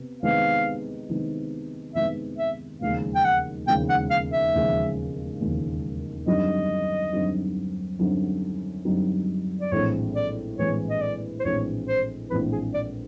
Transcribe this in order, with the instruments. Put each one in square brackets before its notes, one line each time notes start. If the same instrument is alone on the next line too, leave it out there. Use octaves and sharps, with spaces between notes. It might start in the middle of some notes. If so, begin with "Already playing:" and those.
Already playing: [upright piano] C3 B3
[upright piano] C3 D#3 G#3 B3 [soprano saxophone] F5
[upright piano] C3 D#3 G#3 B3
[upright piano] C3 D#3 G#3 B3 [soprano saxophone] E5
[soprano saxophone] E5
[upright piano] E1 D#2 C#3 F3 G#3 [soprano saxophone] F5
[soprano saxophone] G5
F#5
[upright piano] E1 D#2 C#3 F3 G#3 [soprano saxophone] G5
[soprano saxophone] F#5
F5
E5
[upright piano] E1 D#2 C#3 F3 G#3
E1 D#2 C#3 F3 G#3
[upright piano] F#2 D3 G3 C4 D#4 [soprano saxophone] D#5
[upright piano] F#2 D3 G3 C4 D#4
F#2 D3 G3 C4 D#4
F#2 D3 G3 C4 D#4
[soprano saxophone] D5
[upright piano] A#1 A2 E3 G#3 C4 [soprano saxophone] C#5
[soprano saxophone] D5
[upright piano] A#1 A2 E3 G#3 C4 [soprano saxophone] C#5
[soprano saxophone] D#5
D5
C5
[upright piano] A#1 A2 E3 G#3 C4 [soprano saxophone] C#5
[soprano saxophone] C5
[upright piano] A#1 A2 E3 G#3 C4 [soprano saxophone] B4
[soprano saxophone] G#4
D5